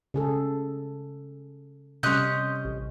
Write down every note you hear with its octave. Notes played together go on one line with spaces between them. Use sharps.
C#3 G#4 A4
C3 G3 C#4 D#5 C6 D#6 F#6 G6
A1